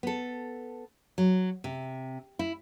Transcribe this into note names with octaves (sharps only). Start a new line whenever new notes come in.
B3 A4
F#3
C3
E4